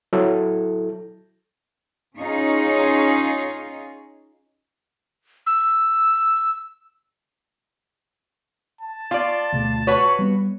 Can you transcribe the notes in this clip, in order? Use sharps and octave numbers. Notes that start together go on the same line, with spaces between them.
F#3 E4 A4
C#4 D#4 F4 G#4 C#5
E6
A5
F4 D5
D2 B2 A3
F#4 B4 C#5
G3 B3